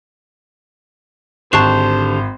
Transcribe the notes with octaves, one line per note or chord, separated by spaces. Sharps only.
G#1 D3 G4 C5 A5 C#6 F#6 C7